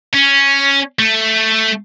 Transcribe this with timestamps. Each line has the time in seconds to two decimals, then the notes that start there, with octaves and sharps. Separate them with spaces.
0.13 C#4
0.99 A3